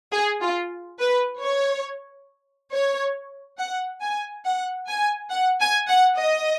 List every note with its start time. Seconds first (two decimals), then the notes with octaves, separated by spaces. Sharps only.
0.13 G#4
0.42 F4
0.99 B4
1.42 C#5
2.72 C#5
3.59 F#5
4.02 G#5
4.45 F#5
4.88 G#5
5.31 F#5
5.60 G#5
5.89 F#5
6.18 D#5